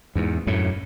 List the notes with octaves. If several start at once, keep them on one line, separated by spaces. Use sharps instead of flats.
E2 G#2
F#2 A2